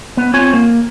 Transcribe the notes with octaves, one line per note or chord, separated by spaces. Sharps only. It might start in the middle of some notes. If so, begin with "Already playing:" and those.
B3
C4 F4 C#5 G#5
A#3